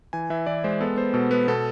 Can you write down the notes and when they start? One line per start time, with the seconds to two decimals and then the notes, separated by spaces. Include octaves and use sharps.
0.13 E3 G#5
0.30 E3 E5
0.46 E3 D5
0.64 G#3 C5
0.81 B3 A4
0.97 B3 C5
1.14 B2 A4
1.31 B3 B4
1.48 B2 A4